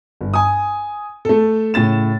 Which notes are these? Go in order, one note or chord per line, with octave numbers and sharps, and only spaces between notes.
G1
G#5 D#6
A3 A4
A2 C#3 A6 E7